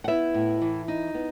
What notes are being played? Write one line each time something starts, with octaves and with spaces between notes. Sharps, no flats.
F#5
B3 E4 E5
A2
E3
D#4
B3